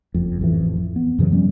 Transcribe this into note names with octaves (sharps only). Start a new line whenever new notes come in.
F#1 F2
A1 F2 E3
F2
B3
F#2 C#3 E3 F#3
F3 G3 B3 C#4